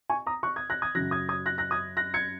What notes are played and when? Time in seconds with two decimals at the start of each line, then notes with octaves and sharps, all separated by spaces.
0.10 G#5 C#6
0.26 A#5 D#6
0.43 C#6 F#6
0.56 D#6 G#6
0.70 F#6 A#6
0.82 D#6 G#6
0.95 F#2 C#3 F#3 F#6 A#6
1.11 D#6 G#6
1.29 D#6 G#6
1.46 F#6 A#6
1.58 F#6 A#6
1.71 D#6 G#6
1.97 F#6 A#6
2.14 G#6 C#7